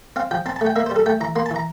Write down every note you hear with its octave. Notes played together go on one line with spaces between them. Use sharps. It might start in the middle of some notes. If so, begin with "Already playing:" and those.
C4 F5
F3 G5
C4 A5
A5
A3
G5
A#3 E5
C5
G3 A4
A3 G5
E3 A#5
A#3 C6
A5
E3 A#5